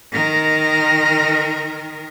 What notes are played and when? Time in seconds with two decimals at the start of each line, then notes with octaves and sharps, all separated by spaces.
0.12 D#3 A#4